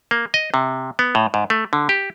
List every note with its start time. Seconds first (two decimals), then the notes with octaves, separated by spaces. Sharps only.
0.11 A#3
0.34 D#5
0.54 C3
0.99 B3
1.15 A2
1.34 G#2
1.50 A3
1.73 D3
1.89 G4